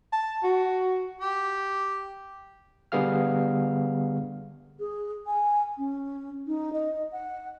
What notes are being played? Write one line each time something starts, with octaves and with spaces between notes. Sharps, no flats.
A5
F#4
G4
D3 G3 B3 G#4 F5 F6
G#4
G#5
C#4
D#4
D#5
F#5